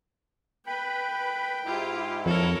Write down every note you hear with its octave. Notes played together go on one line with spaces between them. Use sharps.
B4 G5 B5
G#2 E4 F4 G4
F2 A4 A#4 C#5